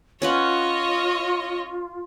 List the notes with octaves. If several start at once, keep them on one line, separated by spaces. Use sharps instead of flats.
C#4 F4 B4 C#5 D#5 F#5